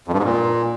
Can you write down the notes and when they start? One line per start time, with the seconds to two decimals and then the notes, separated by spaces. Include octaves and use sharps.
0.08 F2
0.13 G2
0.19 G#2
0.24 A#2